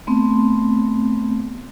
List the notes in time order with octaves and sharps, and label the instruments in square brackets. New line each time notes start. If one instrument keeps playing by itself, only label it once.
[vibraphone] A3 B3 C4